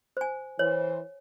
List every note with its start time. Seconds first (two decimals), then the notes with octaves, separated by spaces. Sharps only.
0.17 C5 G#5
0.59 E3 C5 C#5